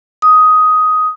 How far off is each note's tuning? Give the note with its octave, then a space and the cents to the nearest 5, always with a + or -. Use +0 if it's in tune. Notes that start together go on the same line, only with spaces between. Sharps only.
D#6 +10